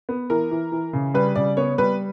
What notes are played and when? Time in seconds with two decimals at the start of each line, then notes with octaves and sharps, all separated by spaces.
0.09 B3
0.30 E3 A#4
0.51 E3
0.72 E3
0.93 C#3
1.14 G3 B4
1.36 C#3 D5
1.57 B3 C#5
1.78 G3 B4